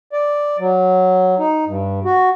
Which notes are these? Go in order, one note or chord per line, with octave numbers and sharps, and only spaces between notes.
D5
F#3
D#4
G2
F#4